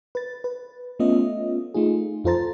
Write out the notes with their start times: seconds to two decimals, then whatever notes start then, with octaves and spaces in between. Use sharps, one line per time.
0.15 B4 A6
0.44 B4
0.99 A3 B3 C#4 F4 D#5 E5
1.74 A3 D#4 F4 G#4
2.24 F2 F4 A4 C5 A#5 A6